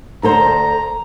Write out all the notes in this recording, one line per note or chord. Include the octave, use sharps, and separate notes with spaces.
D2 A4 C5 A#5